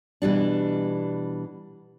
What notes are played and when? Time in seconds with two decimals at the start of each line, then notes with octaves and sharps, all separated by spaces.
0.22 B2 E3 G3 D4